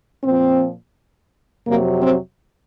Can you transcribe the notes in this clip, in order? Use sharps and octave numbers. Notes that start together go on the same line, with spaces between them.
A#2 F3 C4
F2 C3 F#3 A#3
C4